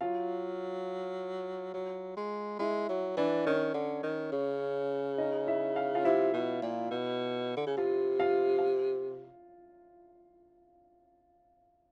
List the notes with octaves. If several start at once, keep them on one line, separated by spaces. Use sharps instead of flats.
F#3 F4 F5
F#3
G#3
G#3 E4 E5
F#3
E3 D4 D5
D#3 C#4 C#5
D3
D#3
C#3
D#4 D#5
E4 E5
F5
F4 F5
C3 E4 E5
B2
A#2
B2
D3
C#3
C3 F4 F5
F4 F5
F5